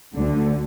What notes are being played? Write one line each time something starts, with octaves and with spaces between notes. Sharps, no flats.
D2 D3